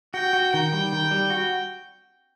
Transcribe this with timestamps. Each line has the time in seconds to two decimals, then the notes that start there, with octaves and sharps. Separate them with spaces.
0.14 F#4 G5
0.33 F#4
0.53 D#3 G5
0.73 G3
0.93 D#3
1.11 G3
1.30 F#4